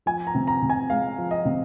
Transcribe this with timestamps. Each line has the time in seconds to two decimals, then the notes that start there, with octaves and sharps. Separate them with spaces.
0.06 F3 G#5
0.27 A#5
0.35 C3
0.47 A#5
0.62 C3
0.70 G#5
0.90 G#3 F5
1.18 F3
1.31 D#5
1.45 C3